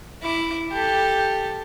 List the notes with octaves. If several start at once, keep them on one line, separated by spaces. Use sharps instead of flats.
E4 D6
G4 A4